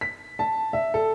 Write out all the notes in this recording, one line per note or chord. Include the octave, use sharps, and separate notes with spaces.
B6
A5
E5
A4